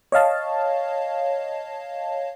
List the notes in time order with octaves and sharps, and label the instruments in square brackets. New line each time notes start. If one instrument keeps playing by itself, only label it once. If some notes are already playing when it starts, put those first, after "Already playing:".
[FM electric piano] C#5 D#5 F5 A5